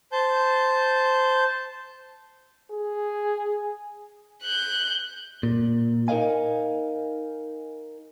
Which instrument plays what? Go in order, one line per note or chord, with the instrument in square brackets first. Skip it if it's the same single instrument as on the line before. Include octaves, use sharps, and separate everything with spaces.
[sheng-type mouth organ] C5 A5 G6
[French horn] G#4
[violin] F#6 G6
[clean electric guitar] A#2
D#4 A#4 B4 D#5 F5 G#5